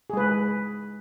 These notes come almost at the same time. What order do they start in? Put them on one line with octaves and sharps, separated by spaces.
G#4 G#3 B4